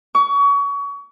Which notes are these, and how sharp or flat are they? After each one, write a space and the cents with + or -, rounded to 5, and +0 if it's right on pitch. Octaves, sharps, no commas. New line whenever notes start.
C#6 +30